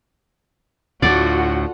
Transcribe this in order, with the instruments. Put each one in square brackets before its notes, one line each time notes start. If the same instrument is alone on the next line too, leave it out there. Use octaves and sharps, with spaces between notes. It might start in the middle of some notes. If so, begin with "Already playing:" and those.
[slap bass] D2 A2 [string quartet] F4 A4 F#5 [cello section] F#4 [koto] D5